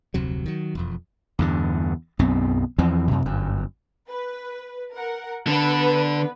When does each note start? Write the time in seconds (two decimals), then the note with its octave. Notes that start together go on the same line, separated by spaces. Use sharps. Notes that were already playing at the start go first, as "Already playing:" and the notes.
0.14 F1 D2 C3 F#3
0.46 D#3 F#3
0.75 E1 F2
1.39 E2 G2 D3
2.19 B1 F#2 B3 C4
2.79 E2 E3 F3 C4
3.07 F#2 C3
3.25 G1 F#2
4.09 B4
4.94 A#4 F#5
5.47 D3 B3 A4 B4